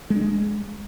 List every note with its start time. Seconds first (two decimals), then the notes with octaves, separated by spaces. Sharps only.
0.10 G#3
0.16 D4
0.21 G#3